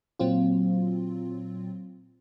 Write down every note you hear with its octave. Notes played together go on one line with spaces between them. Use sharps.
A#2 F#3 C4 F4